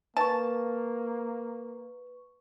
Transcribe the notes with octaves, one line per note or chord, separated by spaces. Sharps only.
A#3 B4 A5 C#6